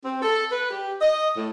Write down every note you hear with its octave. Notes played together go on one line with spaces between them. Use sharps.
C4
A4
B4
G4
D#5
A2